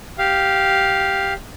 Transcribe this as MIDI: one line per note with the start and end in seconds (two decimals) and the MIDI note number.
0.18 1.33 67
0.18 1.33 77